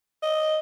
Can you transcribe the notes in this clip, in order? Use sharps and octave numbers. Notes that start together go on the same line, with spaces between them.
D#5